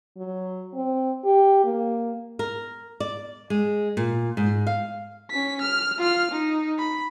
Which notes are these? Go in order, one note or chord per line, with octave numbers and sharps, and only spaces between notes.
F#3
C4
G4
A#3
A#4
D5
G#3
A#2
G#2
F5
C#4 B6
F6
F4 F6
D#4
B5